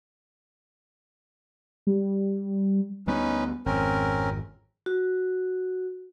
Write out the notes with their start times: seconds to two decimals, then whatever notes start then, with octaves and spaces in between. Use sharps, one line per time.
1.87 G3
3.07 D2 G3 B3 C#4 D#4 B4
3.66 G#1 F2 C4 C#4 A#4
4.86 F#4